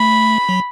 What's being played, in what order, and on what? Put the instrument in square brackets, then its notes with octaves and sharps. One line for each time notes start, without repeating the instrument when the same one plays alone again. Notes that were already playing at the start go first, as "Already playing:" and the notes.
Already playing: [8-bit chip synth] A3 [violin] B5
[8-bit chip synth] F#3